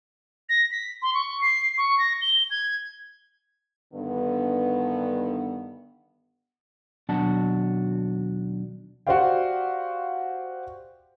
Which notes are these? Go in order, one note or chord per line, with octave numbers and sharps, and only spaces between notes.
A#6
B6
C6
C#6
C7
C#6
A#6
G7
G#6
G2 D3 D#3 B3
D#2 B2 F#3 D4 F#4 A5
F#4 G4 C5 D5 F5 G5